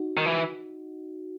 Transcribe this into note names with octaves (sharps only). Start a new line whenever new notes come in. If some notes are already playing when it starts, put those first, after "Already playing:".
Already playing: D#4 F#4
D#3
E3